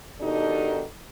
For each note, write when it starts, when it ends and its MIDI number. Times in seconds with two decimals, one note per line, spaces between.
0.21 0.82 47
0.21 0.82 51
0.21 0.82 62
0.21 0.82 63
0.21 0.82 67
0.21 0.82 69